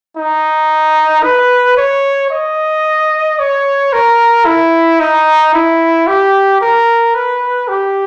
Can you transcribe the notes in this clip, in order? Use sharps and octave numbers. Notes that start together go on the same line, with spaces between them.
D#4
B4
C#5
D#5
C#5
A#4
E4
D#4
E4
G4
A#4
B4
G4